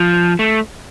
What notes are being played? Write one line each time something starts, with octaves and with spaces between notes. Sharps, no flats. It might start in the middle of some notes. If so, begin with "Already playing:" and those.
Already playing: F3
A3